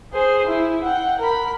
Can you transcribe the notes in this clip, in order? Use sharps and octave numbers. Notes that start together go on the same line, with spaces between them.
G#4 C5
E4
F#5 G5
A#4 B5